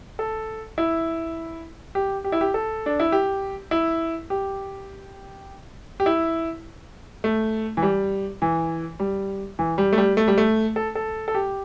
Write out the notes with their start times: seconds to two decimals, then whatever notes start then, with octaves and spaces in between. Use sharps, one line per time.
0.19 A4
0.78 E4
1.95 G4
2.24 G4
2.32 E4
2.41 G4
2.54 A4
2.86 D4
3.00 E4
3.12 G4
3.71 E4
4.30 G4
6.00 G4
6.06 E4
7.24 A3
7.77 E3
7.82 G3
8.42 E3
9.00 G3
9.59 E3
9.78 G3
9.93 A3
9.98 G3
10.17 A3
10.28 G3
10.38 A3
10.76 A4
10.95 A4
11.28 A4
11.35 G4